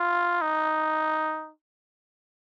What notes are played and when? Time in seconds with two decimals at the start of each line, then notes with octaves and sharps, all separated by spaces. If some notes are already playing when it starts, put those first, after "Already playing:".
Already playing: F4
0.41 D#4